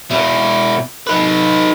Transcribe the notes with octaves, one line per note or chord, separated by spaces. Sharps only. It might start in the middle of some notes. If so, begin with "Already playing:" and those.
B2 E4
D#4 B4